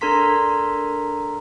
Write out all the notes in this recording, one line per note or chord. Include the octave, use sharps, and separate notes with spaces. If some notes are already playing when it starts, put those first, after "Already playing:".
D4 A4 A#4 A#5 C6 B6